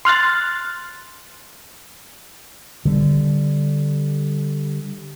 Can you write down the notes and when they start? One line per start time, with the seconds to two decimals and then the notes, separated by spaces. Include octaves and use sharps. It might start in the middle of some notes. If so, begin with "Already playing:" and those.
0.05 C6 F6 F#6 A6
2.85 D3 G3